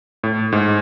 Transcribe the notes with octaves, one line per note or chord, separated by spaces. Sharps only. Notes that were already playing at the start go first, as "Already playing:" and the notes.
A2
G#2